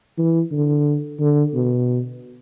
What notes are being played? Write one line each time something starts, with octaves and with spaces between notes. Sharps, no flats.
E3
D3
D3
B2